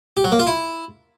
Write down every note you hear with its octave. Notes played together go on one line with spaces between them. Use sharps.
G4
F#3
A#3
F4
E4